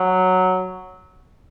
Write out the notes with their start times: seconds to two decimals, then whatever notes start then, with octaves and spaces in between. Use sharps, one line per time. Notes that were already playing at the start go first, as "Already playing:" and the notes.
Already playing: F#3